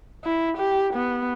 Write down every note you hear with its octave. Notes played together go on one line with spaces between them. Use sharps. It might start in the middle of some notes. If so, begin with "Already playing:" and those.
E4
G4
B3